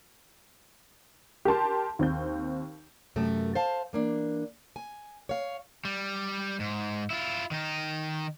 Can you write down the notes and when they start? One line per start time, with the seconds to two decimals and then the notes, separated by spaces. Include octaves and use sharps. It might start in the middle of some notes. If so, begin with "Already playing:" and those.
1.45 G4 A#4 A5 C6
1.99 D#2 C4 G6
3.16 F#2 C3 A3
3.55 C5 F5 A5
3.93 E3 A#3 D4
4.76 G#5
5.29 C#5 F5
5.85 G3
6.60 G#2
7.10 E4 F4
7.51 D#3 D#4